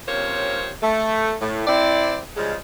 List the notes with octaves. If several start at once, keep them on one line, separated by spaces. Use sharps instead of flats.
F2 C3 A#3 C#4 C5 C#5
A3
A2
C4 E4 D5
C#3 F3 G3 G#3